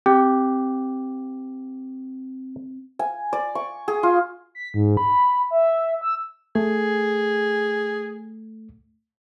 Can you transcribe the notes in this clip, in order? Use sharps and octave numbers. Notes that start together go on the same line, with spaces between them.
C4 G4
G#5
D5
C#6
G#4
F4
B6
G#2
B5
E5
E6
A3 G#4